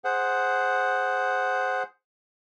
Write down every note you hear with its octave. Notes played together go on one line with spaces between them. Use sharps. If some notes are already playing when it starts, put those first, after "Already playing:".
G#4 C5 F#5